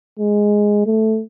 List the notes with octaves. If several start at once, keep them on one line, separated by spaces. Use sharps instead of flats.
G#3
A3